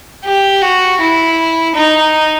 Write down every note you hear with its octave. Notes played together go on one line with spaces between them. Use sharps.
G4
F#4
E4
D#4